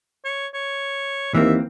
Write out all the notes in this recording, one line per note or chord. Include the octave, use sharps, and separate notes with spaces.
C#5
C#5
D#2 E3 A#3 C4 E5